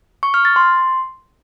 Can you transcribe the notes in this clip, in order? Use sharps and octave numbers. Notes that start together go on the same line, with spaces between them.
C#6
F6
A6
C6